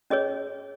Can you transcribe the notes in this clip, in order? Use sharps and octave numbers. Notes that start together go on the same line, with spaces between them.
C#4 G#4 C#5 D#5